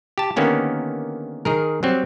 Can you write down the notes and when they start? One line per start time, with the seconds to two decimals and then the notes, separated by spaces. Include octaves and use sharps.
0.18 G4 A5
0.36 D3 D#3 A#3 B3 C#4 G4
1.45 D#3 G#4 A#4
1.83 F#3 G3 C4